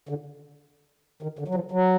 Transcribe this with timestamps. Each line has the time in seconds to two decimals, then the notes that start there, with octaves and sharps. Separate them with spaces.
0.09 D3
1.23 D#3
1.39 D3
1.48 F#3
1.55 F3
1.71 F#3